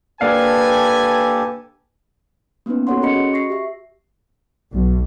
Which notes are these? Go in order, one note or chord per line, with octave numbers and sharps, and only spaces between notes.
A#3 D4 G4 A4 B4 F5 G#5
A#3 B3 C#4 D#4 B4
F#4 A4 A#4 C#5 F#5 C6
C#4 G#4 D#5 B5 C#7
F#4 D#5
C#6 A#6 C7
G4 E5
B1